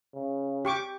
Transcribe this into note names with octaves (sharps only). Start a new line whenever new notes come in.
C#3
G4 C#6 D6